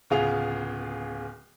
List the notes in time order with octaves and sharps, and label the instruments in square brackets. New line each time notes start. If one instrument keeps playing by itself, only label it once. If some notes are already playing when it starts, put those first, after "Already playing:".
[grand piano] D1 C#3 B3 F4 G#4 F7